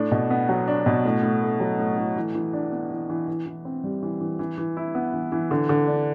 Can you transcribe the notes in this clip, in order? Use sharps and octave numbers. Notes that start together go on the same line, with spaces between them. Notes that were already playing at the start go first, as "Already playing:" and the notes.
Already playing: A2 D4
B2
B3
F#3
D4
B2
A2
A2
A3
F#3
A2
A2
E3
E3
D4
B3
E3
E3
E3
E3
C4
G3
E3
E3
E3
E3
E4
B3
E3
E3
D3
D3
D4